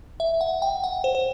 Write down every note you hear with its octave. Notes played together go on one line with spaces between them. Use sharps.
E5
F#5
G5
F#5
C5
C5